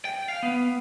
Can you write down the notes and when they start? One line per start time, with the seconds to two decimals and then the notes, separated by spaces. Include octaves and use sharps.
0.05 G5
0.28 F5
0.43 B3